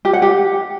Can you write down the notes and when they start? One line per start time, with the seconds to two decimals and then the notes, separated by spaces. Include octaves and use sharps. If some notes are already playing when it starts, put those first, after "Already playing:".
0.05 G4
0.13 F#5
0.22 G4